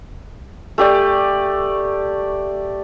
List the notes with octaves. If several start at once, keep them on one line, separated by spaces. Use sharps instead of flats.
A3 G4 D5